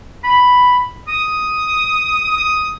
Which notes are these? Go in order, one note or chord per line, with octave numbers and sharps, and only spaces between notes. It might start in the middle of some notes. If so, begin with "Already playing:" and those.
B5
D#6
D#6